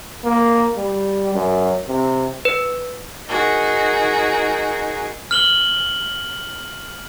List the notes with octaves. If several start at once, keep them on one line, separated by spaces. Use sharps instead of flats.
A#3
G3
F#2
C3
B4
D#4 F#4 G#4 A#4
F6 F#7 G7